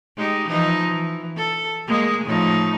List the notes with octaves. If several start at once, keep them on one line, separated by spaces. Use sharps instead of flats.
G#3 D#4 G4
E3 F3 D#4
E3
A4
G#3 A#3 G#4
A2 F3 D#4